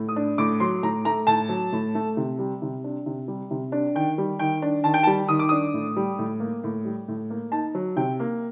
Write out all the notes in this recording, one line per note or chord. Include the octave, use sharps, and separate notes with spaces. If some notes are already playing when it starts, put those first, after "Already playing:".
Already playing: A2
D#6
D4
A2 D6
F#3 C6
A2 A#5
A3 A#5
A2 A5
F#3
A2
A3
C3
G3
C3
D4
C3
G3
C3
D4
D#3 G5
G3
D#3 G5
D4
D#3 A5
G5
A5
G3
D#3 D#6
D6
D4 D#6
A2
G3
A2
A#3
A2
G3
A2
A#3
D#4 A5
F#3
C3 G5
A#3